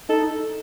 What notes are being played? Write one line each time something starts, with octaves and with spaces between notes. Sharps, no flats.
D#4 A4